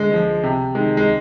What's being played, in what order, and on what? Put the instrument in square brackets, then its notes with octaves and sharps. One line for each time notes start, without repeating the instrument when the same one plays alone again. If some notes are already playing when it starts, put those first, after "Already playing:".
Already playing: [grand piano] D3 G#3
F3 G#3
C3
D#3 G#3
G#3